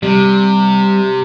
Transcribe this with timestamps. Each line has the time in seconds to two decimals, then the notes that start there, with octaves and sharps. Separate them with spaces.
0.03 C3 G3